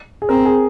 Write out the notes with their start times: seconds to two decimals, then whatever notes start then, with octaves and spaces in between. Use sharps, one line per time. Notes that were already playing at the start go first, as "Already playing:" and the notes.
0.22 G#4
0.29 C4 A#4
0.45 G#4